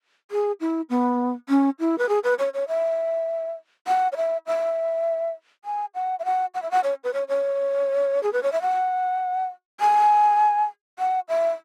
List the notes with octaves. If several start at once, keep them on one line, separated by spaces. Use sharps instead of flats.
G#4
E4
B3
C#4
E4
B4
G#4
B4
C#5
C#5
E5
F#5
C#5
E5
E5
G#5
F#5
E5
F#5
F#5
E5
F#5
C#5
B4
C#5
C#5
G#4
B4
C#5
E5
F#5
G#5
F#5
E5